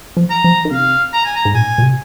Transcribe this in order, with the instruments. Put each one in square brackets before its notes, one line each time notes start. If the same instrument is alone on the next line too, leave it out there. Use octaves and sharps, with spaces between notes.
[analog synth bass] F3
[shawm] A#5
[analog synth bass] F3
D#3
[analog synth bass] C3 [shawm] F5
[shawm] A#5
G#5
A#5
[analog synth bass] G#2
[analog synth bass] A#2 [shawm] G#5
[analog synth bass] A#2
C3